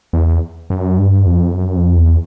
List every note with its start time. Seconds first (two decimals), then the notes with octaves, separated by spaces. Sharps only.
0.13 E2
0.70 F#2
0.98 G2
1.26 F2
1.54 F#2
1.76 F2
1.97 E2